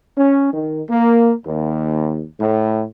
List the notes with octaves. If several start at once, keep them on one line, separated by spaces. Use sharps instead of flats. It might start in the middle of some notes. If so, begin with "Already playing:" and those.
C#4
D#3
A#3
D#2
A2